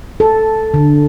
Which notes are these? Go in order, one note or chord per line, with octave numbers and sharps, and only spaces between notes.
A4
D3